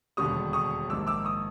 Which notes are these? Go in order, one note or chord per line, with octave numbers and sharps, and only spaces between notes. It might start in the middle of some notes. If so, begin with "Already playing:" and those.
E1 D#2 D3 G3 C#6 D#6
C#6 D#6
A#1 G#2 D#3 D6 E6
D6 E6
C#6 D#6